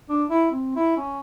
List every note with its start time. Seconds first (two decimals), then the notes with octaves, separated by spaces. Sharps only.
0.09 D4
0.30 E4
0.51 C4
0.76 E4
0.97 C#4